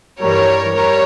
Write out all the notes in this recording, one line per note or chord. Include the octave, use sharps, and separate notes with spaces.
G2 E3 G3 A#4 C#5
G3 A#4 C#5